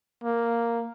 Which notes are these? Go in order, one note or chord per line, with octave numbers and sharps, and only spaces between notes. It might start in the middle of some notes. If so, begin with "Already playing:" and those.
A#3